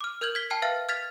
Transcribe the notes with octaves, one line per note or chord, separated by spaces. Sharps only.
D6 F6
A#4 F6 G6 G#6 F#7
G#6 B6 G7
G5 A5 F6 C7
B4 E5 F5 F6 A6
F6 G#6 A6 B6 F7